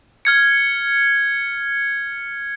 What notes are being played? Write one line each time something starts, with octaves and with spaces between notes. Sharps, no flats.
F6 G#6 C#7